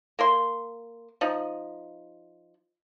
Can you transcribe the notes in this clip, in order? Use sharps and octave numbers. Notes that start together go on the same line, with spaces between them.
A#3 A#4 C6
F3 D#4